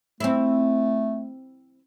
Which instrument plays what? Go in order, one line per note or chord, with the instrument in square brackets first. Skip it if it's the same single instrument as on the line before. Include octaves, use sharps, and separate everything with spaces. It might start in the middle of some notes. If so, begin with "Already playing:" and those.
[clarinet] A3 [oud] C4 E4